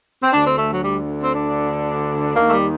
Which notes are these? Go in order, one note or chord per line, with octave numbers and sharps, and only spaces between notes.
C4
D2 D3 D4
C4
A3
F#3
G3
C4
D4
D#2 D#3 A#3
A3
G3